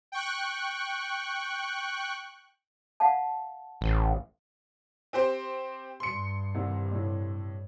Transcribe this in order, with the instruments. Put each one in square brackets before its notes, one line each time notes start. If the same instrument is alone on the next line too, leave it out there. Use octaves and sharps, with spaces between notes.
[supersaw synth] G5 C#6 F#6
[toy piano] F5 F#5 A5
[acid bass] A1
[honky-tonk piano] C4 G4 C5
[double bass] G2 [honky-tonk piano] C6 C#7
[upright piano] C2 C3 D#3
A2 C3